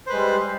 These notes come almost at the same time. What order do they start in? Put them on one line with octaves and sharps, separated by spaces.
C5 B4 G#3 G3